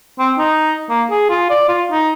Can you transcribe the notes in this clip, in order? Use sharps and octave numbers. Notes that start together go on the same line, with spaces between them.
C4
D#4
A#3
G#4
F4
D5
F4
D#4